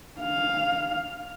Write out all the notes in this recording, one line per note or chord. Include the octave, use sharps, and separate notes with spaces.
F5